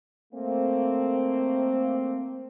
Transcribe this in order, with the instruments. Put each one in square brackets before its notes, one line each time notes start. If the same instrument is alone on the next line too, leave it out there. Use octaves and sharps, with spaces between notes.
[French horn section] A3 A#3 C4